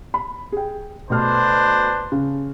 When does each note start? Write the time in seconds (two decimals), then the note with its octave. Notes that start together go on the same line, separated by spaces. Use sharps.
0.14 B5
0.52 G#4 G5
1.10 B2 A3 D4 B4 C5 F6
2.12 C#3